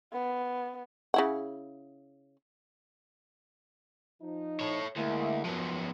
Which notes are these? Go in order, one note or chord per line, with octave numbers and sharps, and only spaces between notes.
B3
C#3 E4 F#5
F3 D#4
A4 C#5
D2 G#3 A#3 E4
F#2 F3 B3